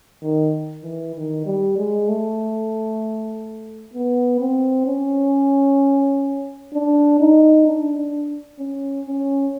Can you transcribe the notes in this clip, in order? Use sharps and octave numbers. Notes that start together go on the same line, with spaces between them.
D#3
E3
D#3
G3
G#3
A3
B3
C4
C#4
D4
D#4
D4
D4
C#4
C#4